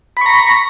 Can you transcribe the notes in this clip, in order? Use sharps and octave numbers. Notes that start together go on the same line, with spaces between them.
A#5 B5 C#6